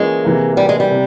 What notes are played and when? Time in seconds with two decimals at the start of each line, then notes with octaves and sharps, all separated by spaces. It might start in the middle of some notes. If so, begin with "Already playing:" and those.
Already playing: E3 G#3 A#3 C#4 F4 G#4
0.24 C3 E3 A#3
0.57 G3
0.69 G#3
0.80 G3
0.91 C3